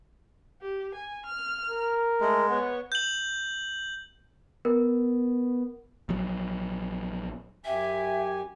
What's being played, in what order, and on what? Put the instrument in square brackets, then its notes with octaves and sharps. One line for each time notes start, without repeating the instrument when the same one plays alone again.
[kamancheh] G4
G#5
F6
[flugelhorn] A#4
[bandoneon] G#3 [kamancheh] A3
[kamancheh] B3 C#5 [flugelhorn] F#5
[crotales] G6 F#7
[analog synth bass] B3 [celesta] A#4
[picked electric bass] A#1 F#3
[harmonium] F#2 G4 G#5 [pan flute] E5